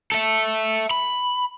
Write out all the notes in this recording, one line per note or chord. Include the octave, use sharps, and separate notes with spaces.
A4 E5
B5